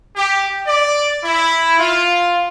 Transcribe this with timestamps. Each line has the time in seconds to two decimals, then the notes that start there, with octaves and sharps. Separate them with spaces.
0.15 G4
0.66 D5
1.24 E4
1.79 F4